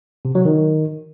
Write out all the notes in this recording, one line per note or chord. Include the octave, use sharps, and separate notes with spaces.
C3
F#3
D#3